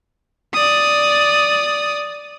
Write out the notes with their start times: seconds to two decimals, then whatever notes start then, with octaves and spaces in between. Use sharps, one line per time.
0.54 D5 D#6